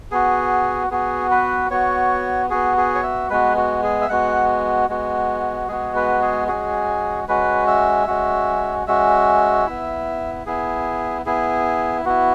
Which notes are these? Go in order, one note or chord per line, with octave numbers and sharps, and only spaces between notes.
B3 F#4 G#4
B3 F#4 G#4
B4
B3 F#4 C#5
B3 F#4 G#4
G#4
C#5
E5
G#3 B3 F#4 B4
F#4
G#4
E5
G#3 B3 F#4 F#5
G#3 B3 F#4
G#3 B3 F#4 G#4
B4
G#4
G#3 C#4 F#4 G#4
G#3 C#4 F#4 B4
E5
G#3 C#4 F#4
G#3 C#4 F#4 E5
B3 E4
B3 E4 G#4
B3 E4 G#4
B3 E4 F#4